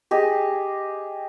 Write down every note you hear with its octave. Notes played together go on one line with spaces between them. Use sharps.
G4 G#4 D#5